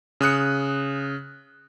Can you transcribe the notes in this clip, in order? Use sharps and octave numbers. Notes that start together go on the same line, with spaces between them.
C#3 D#6 F#6 C#7